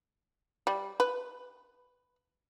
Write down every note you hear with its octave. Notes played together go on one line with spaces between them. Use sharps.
G3
B4